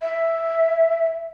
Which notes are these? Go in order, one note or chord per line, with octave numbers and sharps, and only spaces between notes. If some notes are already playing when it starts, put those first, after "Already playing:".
E5